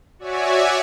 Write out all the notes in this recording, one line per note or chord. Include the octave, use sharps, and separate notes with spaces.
F#4 C#5 D5 E5 G#5